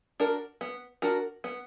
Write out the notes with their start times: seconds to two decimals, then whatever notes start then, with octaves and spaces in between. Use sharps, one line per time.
0.20 D4 F#4 A#4
0.61 B3
1.02 D4 F#4 A#4
1.44 B3